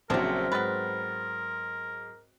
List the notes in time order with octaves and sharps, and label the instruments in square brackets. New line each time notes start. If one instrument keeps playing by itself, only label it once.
[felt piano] A#1 C#3 [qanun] F#3 C4 [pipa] A3 D4 G4 [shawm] A#4
[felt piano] G#2 A6 [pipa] B3 B4